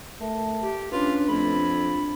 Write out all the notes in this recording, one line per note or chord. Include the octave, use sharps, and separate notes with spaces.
A3 A#4 E5 A5
G4
C#4 D4 F4 B4
F2 A3 B5
F4